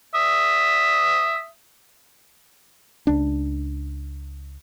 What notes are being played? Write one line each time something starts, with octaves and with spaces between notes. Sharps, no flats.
E5 D#6
C#2 D4